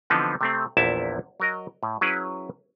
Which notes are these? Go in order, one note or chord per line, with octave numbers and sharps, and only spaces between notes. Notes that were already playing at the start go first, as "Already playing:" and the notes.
D3 E3 F3 B3 C4 D#4
C3 A3 C4
A#1 E2 A#2 E4 E5 A5
F#3 A#4 D#5
A2
F#3 C#4 E4 G#4 B4